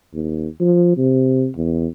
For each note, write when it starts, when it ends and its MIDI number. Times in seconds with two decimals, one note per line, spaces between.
0.14 0.47 39
0.60 0.93 53
0.97 1.48 48
1.57 1.87 40